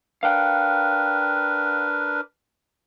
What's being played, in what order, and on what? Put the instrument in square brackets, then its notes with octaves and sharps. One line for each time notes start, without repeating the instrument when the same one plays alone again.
[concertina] D4 A#4 B4 [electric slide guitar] F5 G5